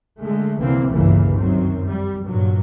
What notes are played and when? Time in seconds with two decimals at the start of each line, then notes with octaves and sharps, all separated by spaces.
0.21 D3 G#3 A3
0.60 C2 D3 E3 A#3 C4
0.91 G1 C#2 A#2 C#3 E3 A#3
1.38 F#2 D#3 F#3 C4
1.86 G3
2.27 G2 A#2 D3 F#3